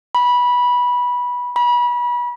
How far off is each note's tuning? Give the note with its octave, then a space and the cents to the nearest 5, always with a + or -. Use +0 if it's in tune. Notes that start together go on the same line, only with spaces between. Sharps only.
B5 -15
B5 -30